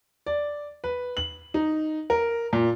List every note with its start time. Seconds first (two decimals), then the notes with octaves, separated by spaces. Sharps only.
0.26 D5
0.84 B4
1.17 F#7
1.54 D#4
2.10 A#4
2.53 A#2